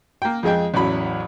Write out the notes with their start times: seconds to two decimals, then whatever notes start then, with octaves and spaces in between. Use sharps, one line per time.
0.22 A#3 G5
0.43 F2 G#3 G#4 D#5 G5
0.74 A1 E2 F#3 B5